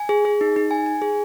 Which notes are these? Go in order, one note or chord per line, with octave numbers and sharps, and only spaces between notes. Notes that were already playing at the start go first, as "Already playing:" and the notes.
Already playing: G#5
G#4
G#4
D#4
D#4
G#5
G#5
G#4